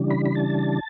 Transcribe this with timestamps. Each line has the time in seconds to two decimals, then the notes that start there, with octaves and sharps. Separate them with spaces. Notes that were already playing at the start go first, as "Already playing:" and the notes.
Already playing: C#3 E3 G3 D4
0.11 B5
0.25 B5
0.35 A5